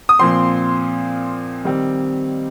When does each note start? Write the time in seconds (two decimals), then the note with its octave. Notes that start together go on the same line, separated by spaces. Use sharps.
0.09 D#6
0.19 A#2 F3 C4 C6
1.65 D#3 G3 C4